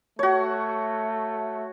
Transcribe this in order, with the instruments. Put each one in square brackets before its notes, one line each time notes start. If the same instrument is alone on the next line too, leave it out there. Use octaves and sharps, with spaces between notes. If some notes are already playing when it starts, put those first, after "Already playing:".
[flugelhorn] A3 [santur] F#4 C#5